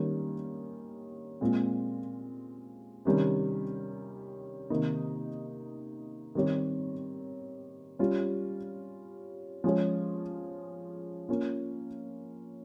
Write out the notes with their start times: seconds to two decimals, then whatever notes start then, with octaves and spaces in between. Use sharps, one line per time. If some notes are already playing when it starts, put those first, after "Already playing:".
Already playing: D#3 G3 A#3 C#4
1.41 A#2 G#3 C4 F4
3.05 C3 D#3 G3 C#4
4.70 C3 D#3 A#3 D#4
6.35 D#3 G3 C4 G4 C#5
7.99 G3 C#4 F4
9.64 F3 G#3 C#4 G#4 C#5
11.29 A#3 C#4 F4